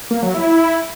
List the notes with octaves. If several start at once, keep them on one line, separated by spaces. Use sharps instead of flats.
A#3
F#3
E4